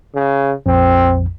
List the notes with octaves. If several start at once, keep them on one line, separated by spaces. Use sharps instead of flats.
C#3
A#1 F2 C4